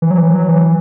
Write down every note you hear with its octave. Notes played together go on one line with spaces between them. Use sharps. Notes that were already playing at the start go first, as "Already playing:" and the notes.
E3
F#3
E3
F#3
E3